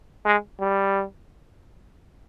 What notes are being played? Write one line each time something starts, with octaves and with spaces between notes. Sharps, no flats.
G#3
G3